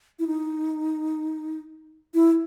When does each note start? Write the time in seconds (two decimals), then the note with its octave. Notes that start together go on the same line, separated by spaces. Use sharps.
0.19 E4
0.27 D#4
2.14 E4